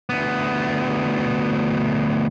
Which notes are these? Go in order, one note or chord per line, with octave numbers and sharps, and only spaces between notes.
D2 B3